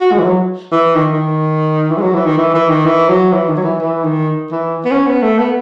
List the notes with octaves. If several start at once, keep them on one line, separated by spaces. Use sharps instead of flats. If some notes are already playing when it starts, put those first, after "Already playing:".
F#4
G#3
E3
F#3
E3
D#3
D#3
E3
G#3
F#3
E3
D#3
E3
E3
D#3
E3
F#3
E3
D#3
F#3
E3
E3
D#3
E3
B3
C#4
B3
A3
B3